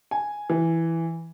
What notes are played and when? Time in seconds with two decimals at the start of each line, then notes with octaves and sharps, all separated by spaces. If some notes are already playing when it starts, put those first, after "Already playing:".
0.11 G#5
0.50 E3